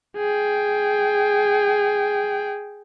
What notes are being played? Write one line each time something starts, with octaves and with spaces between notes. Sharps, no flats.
G#4 G5